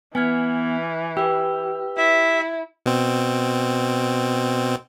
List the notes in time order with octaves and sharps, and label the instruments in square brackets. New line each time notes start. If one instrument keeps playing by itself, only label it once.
[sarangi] E3 [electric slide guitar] B3 [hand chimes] G#5 F6 G#6
[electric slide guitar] G4 [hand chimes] B4 E6
[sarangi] E4 [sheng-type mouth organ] E5
[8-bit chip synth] B2 C4